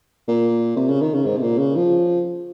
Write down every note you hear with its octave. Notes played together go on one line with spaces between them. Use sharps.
A#2
C3
C#3
D#3
C#3
G#2
C3
A#2
C#3
F3